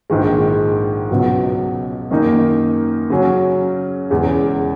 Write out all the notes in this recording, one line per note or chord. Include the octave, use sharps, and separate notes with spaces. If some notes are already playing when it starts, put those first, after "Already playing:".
A#1 G#2 D#3 G#3
C#2 B2 F#3
F#2 D#3 A#3 D#4 A#4
C#3 F#3 C#4
E1 E2 C#3 G#3